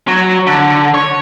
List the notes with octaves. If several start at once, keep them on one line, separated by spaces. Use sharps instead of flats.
F#3
D3
C#5